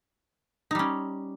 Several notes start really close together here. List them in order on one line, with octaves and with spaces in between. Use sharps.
D#4 G3 C#4